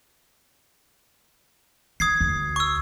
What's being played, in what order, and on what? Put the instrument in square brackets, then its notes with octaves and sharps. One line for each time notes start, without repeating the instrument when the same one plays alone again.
[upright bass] D#3 [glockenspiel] D#6 G#6 C7
[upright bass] D2
[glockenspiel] C#6 E6